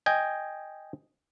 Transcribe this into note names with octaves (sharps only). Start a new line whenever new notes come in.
D#5 G5 G#5